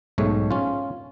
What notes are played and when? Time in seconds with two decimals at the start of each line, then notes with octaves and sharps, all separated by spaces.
0.18 B1 G#2 A3 C#5
0.51 C#4 F4